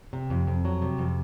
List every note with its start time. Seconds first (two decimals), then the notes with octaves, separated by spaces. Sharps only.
0.13 C3
0.30 F2
0.47 F2
0.65 F#3
0.82 C3
0.98 F2